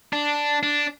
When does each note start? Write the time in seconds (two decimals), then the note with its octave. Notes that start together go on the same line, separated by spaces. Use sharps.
0.13 D4
0.63 D4